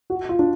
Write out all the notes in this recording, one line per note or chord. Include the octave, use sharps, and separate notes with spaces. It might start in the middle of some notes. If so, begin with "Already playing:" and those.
F#4
F4
D4